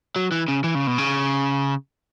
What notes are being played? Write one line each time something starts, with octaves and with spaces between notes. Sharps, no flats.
F#3
E3
C#3
E3
C#3
B2
C#3